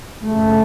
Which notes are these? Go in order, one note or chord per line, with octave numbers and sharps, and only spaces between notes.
F#2 C#3 A3